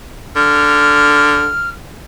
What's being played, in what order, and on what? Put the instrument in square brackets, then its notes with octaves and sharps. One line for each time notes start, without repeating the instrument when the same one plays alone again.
[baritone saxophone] D3 [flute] F6